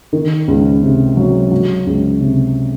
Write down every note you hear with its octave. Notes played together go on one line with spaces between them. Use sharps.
D#3
C#2
C3
F#3
F#3
C#2
C3